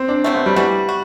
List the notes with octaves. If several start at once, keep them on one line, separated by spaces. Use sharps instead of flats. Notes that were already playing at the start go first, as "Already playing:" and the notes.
Already playing: C4
D4
C3 F#3 A3 C4
B3
G3
E3 G3 B3 D4 F#4
F#4